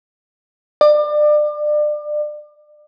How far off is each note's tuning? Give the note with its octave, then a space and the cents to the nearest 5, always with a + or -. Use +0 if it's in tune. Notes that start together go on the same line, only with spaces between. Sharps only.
D5 +30